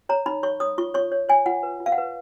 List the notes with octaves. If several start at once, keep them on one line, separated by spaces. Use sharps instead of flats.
C#5 A#5
D#4 B5
C#5 C#6
C#5 D#6
F4 C#6
C#5 C#6
C#5
C#5 G#5
F4 F#5
B4
F4
F5
F#5
B4